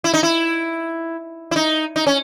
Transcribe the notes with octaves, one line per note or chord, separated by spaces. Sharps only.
E4
D#4
E4
E4
D#4
D#4
C#4